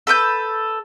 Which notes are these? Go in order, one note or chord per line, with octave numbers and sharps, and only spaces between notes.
A4 B4 D6 G6